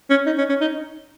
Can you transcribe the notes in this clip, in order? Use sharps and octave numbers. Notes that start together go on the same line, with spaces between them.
C#4
D#4
C#4
C#4
D#4